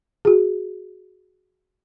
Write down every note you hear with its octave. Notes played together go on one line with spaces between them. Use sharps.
F#4 G#4